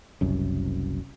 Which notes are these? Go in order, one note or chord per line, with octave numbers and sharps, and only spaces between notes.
F#1 C2 F#2